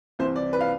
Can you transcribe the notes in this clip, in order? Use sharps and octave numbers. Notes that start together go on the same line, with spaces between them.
C2 C3 E3 C5
D5
B4
F5